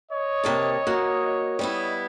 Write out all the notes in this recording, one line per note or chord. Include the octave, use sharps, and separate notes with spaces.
C#5 D#5
C3 A#3 A5
A#3 F#4
G3 B3 E4